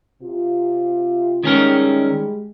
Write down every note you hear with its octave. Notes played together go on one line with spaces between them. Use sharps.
C3 F4
D#3 G3 G#3 C#4 G#4 A#4